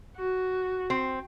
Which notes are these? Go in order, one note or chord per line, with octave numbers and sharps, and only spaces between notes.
F#4
C4